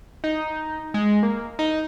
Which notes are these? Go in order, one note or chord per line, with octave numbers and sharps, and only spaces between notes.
D#4
G#3
A#3
D#4